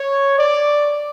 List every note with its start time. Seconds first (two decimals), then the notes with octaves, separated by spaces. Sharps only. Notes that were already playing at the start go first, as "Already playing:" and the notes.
Already playing: C#5
0.38 D5